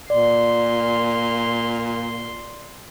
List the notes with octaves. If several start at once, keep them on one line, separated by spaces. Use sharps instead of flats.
A#2 D5 C6